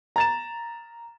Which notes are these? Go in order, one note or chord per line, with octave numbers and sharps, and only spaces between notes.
A#5 A6 E7